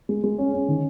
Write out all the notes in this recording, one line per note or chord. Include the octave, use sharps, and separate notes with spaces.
G#3
G#3
C#4
C#4
D#3